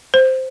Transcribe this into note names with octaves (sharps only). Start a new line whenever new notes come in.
C5